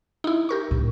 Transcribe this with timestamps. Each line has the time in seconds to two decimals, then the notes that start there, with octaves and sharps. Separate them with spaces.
0.24 D#4 E4
0.49 G4 A#4 C#6
0.71 A2 D3